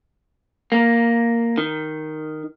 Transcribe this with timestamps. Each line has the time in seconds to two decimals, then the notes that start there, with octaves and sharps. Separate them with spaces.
0.72 A#3
1.58 D#3